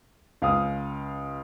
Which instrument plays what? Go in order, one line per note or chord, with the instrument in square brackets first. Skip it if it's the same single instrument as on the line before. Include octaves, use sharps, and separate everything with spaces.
[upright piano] C#2 F5 D#6